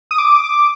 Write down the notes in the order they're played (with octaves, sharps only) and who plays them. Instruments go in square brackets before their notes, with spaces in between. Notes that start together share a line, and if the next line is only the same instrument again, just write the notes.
[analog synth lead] D#6
D6
D6